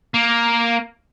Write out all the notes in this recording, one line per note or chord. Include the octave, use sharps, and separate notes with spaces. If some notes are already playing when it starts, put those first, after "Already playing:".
A#3